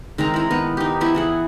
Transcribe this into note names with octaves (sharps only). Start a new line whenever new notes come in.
D#3 G#3 C4 A#5
E4 A#5
D#3 B3
D#4 G4
F3 B3 E4 E5
E3 G#4 F#5